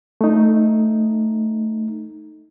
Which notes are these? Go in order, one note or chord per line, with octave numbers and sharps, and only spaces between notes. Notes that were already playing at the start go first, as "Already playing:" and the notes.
A3 D#4